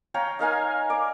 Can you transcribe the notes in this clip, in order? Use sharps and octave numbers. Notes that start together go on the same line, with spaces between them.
C#5 F5 G5 A#5
D#4 A#4 F5 G#5
D5 D6